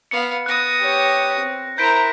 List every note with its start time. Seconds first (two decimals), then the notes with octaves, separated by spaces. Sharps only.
0.11 B3 F5 C#7
0.46 B3 D#6 F#6 A#6
0.81 G4 C#5
1.39 C4
1.78 E4 A#4 C5 A#5 G6 B6 D7